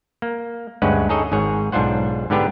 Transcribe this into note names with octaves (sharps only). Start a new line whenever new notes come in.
A#3
D2 G2 G#3 C#4 B4 F#5
D#4 G#4 A4 C#5 D#5
G#1 G#2 G#4 C#5
B1 G#2 D4 F4 C5 F#5
G#2 D3 B3 D4 G4 B4